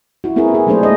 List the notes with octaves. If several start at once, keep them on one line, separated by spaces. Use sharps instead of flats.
E4 F#4
B3 C4 E4 F4 G#4 A#4
G#4
F#3 A3 A#3 D4 G#4 C5
G#3 D#5